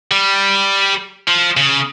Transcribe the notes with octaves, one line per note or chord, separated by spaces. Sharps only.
G3
F3
C#3